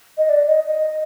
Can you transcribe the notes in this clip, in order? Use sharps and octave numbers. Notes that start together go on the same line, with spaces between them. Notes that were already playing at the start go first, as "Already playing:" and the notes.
D#5
D5
D#5
D#5